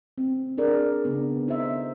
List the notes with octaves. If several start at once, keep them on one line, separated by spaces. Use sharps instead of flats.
C4
D4 G#4 A#4 D5
C#3 B3 D4
D#4 C5 E5